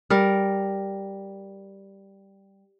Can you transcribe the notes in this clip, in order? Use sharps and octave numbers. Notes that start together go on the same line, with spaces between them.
G3 A#4